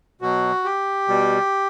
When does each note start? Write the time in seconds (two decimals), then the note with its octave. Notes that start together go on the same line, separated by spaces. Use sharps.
0.21 B2 F#3 F#4
0.65 G4
1.08 B2 G3